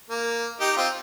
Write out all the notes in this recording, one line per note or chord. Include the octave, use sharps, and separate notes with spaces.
A#3
D#4 G4
C4 F4